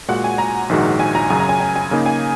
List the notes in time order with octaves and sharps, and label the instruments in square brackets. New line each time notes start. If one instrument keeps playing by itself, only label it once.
[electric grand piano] A#2 G#3 F#4 [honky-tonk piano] F#5
[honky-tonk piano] G#5
A#5
[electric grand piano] A#1 G#2 D#3 G#3 F#4
[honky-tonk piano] G#5
A#5
[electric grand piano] F#2 C#3 F#3 [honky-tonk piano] G#5
[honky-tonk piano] A#5
G#5
G#5
G#5
[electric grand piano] C#3 A#3 D#4 G#4
[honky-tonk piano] G#5